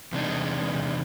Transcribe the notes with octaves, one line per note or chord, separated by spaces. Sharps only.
E2 C3 G#3 D4 D#4